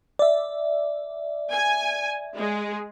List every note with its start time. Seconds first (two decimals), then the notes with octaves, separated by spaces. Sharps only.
0.19 D5 E5
1.52 G#5
2.35 G#3 G#4